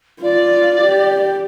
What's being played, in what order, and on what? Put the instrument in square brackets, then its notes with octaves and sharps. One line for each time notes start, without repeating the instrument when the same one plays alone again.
[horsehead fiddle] F4 [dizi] D5
[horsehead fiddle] G4